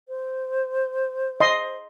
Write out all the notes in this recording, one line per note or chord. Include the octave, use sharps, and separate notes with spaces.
C5
D#5 C6